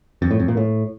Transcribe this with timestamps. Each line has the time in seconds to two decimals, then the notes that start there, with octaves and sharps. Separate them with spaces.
0.22 F2
0.31 A2
0.39 F2
0.48 A#2
0.57 A2